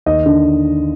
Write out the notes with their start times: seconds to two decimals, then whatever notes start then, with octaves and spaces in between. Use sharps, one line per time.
0.06 D#2 D#5
0.26 D3